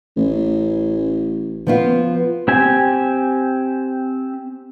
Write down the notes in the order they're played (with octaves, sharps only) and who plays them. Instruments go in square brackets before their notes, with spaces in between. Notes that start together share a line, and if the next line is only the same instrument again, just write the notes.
[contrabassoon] A1
[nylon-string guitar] F3 B3 F4
[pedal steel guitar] C4 G4 G#5